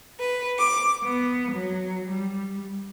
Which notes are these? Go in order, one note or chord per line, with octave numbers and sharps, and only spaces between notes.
B4
D6
B3
F#3
G3